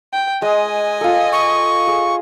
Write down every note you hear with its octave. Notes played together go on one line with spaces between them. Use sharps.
G5
G#3 D#5 G#5
F4 A4
C#6
G#4